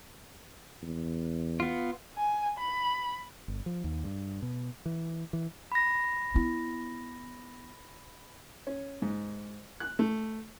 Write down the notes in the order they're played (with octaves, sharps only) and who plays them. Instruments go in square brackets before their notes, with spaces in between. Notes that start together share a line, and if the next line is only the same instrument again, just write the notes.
[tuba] E2
[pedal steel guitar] B3 F4
[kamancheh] G#5
B5
[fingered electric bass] G1
F3
D#2
G2
B2
E3
E3
[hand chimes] B5 A#6
[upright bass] B3 E4
[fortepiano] C#4
G#2
F#6
A3